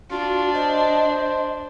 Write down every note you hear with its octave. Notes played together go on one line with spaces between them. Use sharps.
D4 F4 F#4
C5 D#5